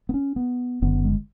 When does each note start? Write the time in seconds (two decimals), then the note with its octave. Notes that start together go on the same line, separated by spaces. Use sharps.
0.09 B3
0.14 C#4
0.36 B3
0.82 F#1 F#2 D3 B3
1.05 G#3